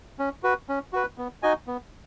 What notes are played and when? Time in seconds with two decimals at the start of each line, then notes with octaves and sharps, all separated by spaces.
0.19 C#4
0.43 F#4 B4
0.69 C#4
0.93 F#4 B4
1.18 B3
1.43 D#4 F#4 D#5 G#5
1.67 B3